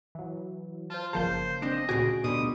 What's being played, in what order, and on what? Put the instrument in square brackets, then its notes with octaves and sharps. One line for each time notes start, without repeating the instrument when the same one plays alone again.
[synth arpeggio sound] E3 F#3
[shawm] F4 [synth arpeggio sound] C5 A5
[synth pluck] G1 F3 A5 [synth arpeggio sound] C#3 A#3 G6 [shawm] C5
[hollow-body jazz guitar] C4 D4 [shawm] D#5
[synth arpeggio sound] D2 A#2 D7 [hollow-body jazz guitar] C#3 G#4 G#5 [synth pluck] F#4
[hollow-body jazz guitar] B2 D3 G3 [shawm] D#6